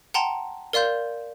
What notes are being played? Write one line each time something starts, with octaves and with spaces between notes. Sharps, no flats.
F#5 G5 A5 A#5 C6
A#4 D5 F5 C6 G6